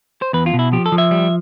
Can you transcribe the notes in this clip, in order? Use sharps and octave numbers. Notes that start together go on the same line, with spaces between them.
C5
E2 B4
F4
B2
E4
F3 G4
A4
F3
E5
G3